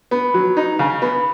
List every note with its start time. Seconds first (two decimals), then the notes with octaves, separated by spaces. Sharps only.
0.11 B3
0.34 F#3
0.57 D#4
0.79 C#3
1.02 B3